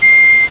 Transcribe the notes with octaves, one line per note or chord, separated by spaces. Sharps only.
C7